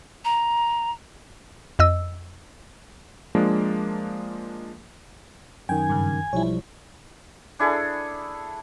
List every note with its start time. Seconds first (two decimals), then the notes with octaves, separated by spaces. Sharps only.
0.25 A#5
1.79 F2 D#5 E6
3.35 F3 G#3 A#3 D4
5.69 F#2 D#3 G5 G#5
5.89 G2 C#3
6.33 B1 F3 G3 E4 C#5
7.59 D4 E4 G#4 A4